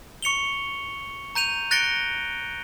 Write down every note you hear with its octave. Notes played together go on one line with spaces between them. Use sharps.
C#6 C#7 F7 G7
A#5 G6 D#7 F7
F#6 A6 A#6 C#7 D7 G7